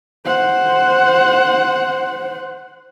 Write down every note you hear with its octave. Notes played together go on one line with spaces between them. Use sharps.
C5 F#5